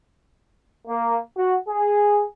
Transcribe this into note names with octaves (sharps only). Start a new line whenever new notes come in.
A#3
F#4
G#4